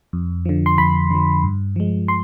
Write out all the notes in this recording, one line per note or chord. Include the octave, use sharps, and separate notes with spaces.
F2
D3 F3
C6
F2 B5
D3 F3
G2
F3 G#3
C6